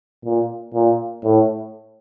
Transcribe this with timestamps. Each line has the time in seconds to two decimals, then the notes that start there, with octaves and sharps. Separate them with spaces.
0.25 A#2
0.74 A#2
1.24 A2